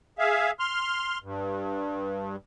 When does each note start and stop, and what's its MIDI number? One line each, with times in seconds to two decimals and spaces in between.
0.19 0.51 68
0.19 0.51 76
0.19 0.51 77
0.59 1.18 84
0.59 1.18 89
1.23 2.36 43